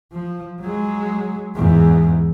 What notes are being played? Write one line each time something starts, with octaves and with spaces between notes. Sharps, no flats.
F3
F#3 G#3
E2 G#2